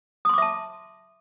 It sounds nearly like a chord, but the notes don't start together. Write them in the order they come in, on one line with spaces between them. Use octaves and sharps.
D#6 C6 D6 E5 A5